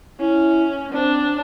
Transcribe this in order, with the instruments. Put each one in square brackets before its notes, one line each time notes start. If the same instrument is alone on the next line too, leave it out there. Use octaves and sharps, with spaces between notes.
[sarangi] C#4 [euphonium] E4
[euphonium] C4 [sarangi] D4